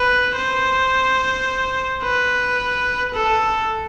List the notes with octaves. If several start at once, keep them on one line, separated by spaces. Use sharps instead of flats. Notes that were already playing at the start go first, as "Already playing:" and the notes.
Already playing: B4
C5
B4
A4